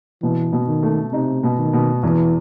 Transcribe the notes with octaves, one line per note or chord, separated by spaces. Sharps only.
B2 E3
B2
D#3
A3
C3 D#4
B2
D#3
B2
E2 E3